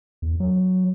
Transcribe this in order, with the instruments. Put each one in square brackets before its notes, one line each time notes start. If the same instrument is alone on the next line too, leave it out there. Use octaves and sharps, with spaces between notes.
[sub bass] E2
F#3